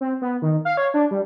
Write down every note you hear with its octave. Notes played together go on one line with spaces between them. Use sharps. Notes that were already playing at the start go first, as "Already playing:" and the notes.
C4
B3
D#3
F5
C#5
D4
G3